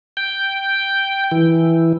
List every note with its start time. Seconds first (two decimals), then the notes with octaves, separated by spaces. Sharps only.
0.17 G5
1.31 E3